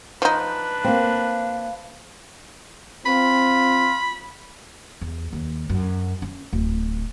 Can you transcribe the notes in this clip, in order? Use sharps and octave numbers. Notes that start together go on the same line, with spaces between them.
F3 D4 D#4 B4
A#3 C4 F5
C4 F4 B5
E2
D#2
F#2
C#4
D1